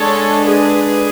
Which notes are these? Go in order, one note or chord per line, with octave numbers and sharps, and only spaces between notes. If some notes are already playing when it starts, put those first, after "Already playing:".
Already playing: D3 G#3 D4 A4 C#5
G#4 B4